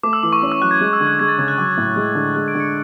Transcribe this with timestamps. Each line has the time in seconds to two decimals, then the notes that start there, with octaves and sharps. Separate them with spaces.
0.03 A3 D6
0.13 E6
0.23 E3 D6
0.32 C#6
0.42 C#4 D6
0.52 E6
0.61 F#3 F#6
0.71 G#6
0.80 G#3 F#6
0.93 E6
1.00 D3
1.07 F#6
1.19 G#3 G#6
1.28 A6
1.38 C#3 G#6
1.48 F#6
1.58 F#3 D6
1.66 C#6
1.73 A2 D6
1.96 G#3
2.15 D3
2.35 G#3 F#6
2.48 D7
2.55 D3
2.60 C#7